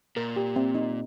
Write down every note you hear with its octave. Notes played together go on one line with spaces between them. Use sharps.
A#2 A#4
G4
C4
D#4